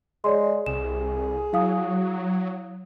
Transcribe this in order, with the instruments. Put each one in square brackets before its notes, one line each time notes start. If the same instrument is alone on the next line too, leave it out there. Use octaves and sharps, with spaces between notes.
[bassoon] G#3 [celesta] C#5 D5 C6
[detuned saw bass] C2 [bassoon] G#4 [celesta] E7
[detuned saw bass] F#3 [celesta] E4 F5 D#6